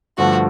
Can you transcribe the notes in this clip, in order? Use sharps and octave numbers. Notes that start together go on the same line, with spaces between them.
G2 D3 F3 A3 F#4